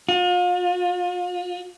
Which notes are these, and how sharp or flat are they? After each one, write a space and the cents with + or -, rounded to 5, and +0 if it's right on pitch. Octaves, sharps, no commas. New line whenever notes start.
F4 +40